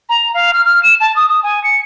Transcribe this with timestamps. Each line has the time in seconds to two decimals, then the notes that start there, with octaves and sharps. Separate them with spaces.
0.09 A#5
0.34 F5
0.53 F6
0.65 F6
0.83 E7
1.01 A5
1.16 D#6
1.29 D#6
1.43 G#5
1.64 C#7